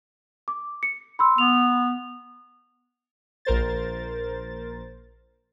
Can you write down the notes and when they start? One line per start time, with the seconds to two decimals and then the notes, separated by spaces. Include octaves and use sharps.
0.48 D6
0.83 C#7
1.19 B5 C6 E6
1.38 B3 F7
3.45 A#1 A#4 C5 A6